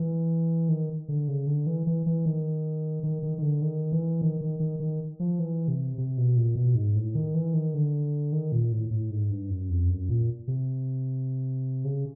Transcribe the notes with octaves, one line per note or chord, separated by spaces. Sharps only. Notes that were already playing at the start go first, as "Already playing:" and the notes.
Already playing: E3
D#3
D3
C#3
D3
E3
E3
E3
D#3
D#3
D#3
D#3
D3
D#3
E3
D#3
D#3
D#3
D#3
F3
E3
C3
C3
B2
A#2
B2
G#2
A2
D#3
E3
D#3
D3
D#3
A#2
A2
A2
G#2
G2
F#2
F2
F#2
A#2
C3
C#3